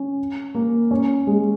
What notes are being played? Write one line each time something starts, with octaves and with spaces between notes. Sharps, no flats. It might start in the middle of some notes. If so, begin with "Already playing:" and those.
Already playing: C#4
A#3
C#4
G#3